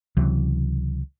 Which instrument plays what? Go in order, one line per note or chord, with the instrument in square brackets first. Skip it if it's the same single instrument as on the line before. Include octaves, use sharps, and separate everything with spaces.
[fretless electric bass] C#2 C3 E3 F#3